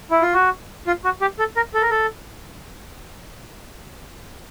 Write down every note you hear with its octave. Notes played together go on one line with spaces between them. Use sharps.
E4
F4
F#4
F4
F#4
G4
A4
A#4
A4
A#4
A4